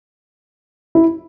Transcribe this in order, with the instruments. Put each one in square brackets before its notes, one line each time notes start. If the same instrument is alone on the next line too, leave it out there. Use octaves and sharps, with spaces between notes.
[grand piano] E4